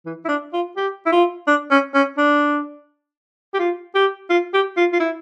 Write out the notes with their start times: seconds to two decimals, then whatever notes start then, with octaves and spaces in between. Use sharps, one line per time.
0.05 E3
0.24 E4
0.28 D4
0.53 F4
0.76 G4
1.06 E4
1.12 F4
1.47 D4
1.71 C#4
1.95 C#4
2.17 D4
3.54 G4
3.59 F4
3.95 G4
4.30 F4
4.53 G4
4.77 F4
4.93 F4
5.00 E4